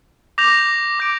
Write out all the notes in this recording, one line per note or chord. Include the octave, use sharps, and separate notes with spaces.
D6 G6 A#6 F7
D6 G6 A#6 D7